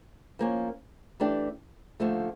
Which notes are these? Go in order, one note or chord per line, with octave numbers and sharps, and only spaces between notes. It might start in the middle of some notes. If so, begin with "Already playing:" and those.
F3 A#3 C#4
E3 A3 D4 G4
D#2 D3 F3 A3